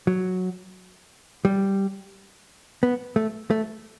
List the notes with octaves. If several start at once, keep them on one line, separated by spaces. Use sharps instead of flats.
F#3
G3
B3
A3
A3